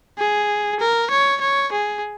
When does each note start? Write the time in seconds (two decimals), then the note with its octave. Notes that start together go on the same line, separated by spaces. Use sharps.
0.18 G#4
0.80 A#4
1.10 C#5
1.41 C#5
1.72 G#4